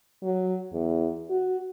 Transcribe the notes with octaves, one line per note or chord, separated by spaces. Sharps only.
F#3
E2
F#4